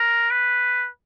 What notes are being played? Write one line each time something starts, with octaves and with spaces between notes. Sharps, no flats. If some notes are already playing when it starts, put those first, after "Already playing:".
Already playing: A#4
B4